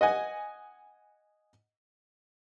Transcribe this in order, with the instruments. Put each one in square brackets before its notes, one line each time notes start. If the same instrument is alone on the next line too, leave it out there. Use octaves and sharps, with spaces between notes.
[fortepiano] D#5 F#5 G#5